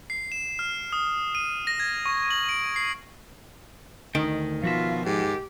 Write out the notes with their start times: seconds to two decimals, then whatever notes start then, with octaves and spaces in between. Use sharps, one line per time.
0.10 C7
0.32 E7
0.59 F6
0.93 D#6
1.35 D#7
1.67 A#6
1.80 G#6
2.06 C#6
2.31 F#7
2.49 D7
2.76 C7
4.15 D2 D#3 G5
4.63 B2 F3 F4 F#4 E5
5.06 G#2 G4